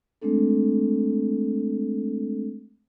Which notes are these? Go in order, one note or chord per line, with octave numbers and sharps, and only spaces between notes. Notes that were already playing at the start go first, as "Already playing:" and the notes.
G#3 A3 C4 D4 A4